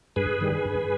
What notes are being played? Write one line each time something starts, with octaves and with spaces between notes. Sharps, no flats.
G2 G#4 B4
D#3 G3
G2